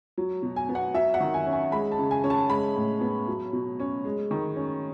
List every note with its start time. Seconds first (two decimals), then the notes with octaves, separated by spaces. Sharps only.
0.18 F#3
0.42 B2
0.56 G#5
0.69 B3
0.75 F#5
0.94 F#3 E5
1.14 F#5
1.20 D#3
1.34 G#5
1.46 C#4
1.52 G#5
1.72 G#3 B5
1.92 A5
1.99 C#3
2.11 G#5
2.24 C#4
2.30 A5
2.49 G#3 B5
2.76 A2
3.01 B3
3.28 F#3
3.53 B2
3.80 C#4
4.05 G#3
4.31 D#3
4.56 C#4